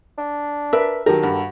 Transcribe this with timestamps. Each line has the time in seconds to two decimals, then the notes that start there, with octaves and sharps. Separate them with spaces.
0.18 D4
0.73 A#4 B4 E5
1.06 D#3 F#3 G4 A4 A#4
1.23 G2 F#4